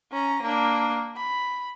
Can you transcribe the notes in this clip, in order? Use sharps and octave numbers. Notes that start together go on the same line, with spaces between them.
C#4 A#5
A#3 D4
B5